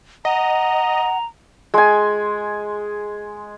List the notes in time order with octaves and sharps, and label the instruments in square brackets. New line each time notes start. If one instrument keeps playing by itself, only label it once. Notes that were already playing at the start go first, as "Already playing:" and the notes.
[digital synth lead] D#5 [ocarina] F#5 [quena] A#5
[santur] G#3 G#5